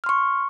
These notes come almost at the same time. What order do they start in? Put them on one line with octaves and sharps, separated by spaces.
F6 C6 C#6